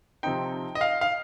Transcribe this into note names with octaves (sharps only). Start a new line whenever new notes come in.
C3 F3 C4 D#4 G5
D#5
F5
F5